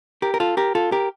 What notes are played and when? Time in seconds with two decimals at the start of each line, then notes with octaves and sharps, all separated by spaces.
0.22 G4 A#4
0.34 A#4
0.40 F4 A4
0.57 G4 A#4
0.75 F4 A4
0.92 G4 A#4